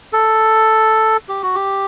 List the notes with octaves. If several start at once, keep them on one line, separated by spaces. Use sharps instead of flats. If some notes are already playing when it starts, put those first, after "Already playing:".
A4
G4
F#4
G4